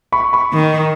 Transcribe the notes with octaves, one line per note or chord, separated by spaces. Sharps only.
B5 C#6
B5 C#6
D#3